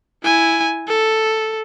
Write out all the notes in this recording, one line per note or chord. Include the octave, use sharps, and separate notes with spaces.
E4 G#5
A4